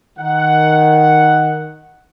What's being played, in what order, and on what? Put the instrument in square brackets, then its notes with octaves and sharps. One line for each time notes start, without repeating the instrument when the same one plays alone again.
[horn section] D#3 F#5